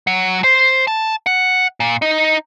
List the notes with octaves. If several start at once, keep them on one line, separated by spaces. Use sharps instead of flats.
F#3
C5
A5
F#5
A#2
D#4